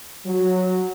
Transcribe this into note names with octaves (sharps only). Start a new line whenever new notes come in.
F#3